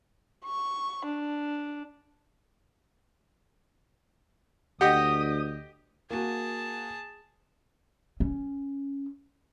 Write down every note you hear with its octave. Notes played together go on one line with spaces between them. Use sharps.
C#6
D4
D2 G4 D#5 F#5 D#6
A#3 F#4 G#4 A5
C#4